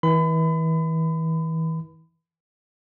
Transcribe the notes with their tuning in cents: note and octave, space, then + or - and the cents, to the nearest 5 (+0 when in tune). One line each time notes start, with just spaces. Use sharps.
E3 -35 B5 +35